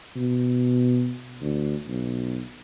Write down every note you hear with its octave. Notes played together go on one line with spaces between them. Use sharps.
B2
D2
B1